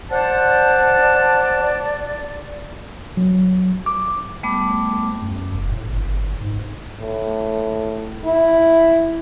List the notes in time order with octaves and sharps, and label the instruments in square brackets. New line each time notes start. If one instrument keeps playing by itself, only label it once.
[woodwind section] C5 F#5 A5 [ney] D5
[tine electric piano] F#3
D6
[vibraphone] G3 A3 B3 D6
[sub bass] F#2
F1
A2
G1
G1
G#2
[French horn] A2
E4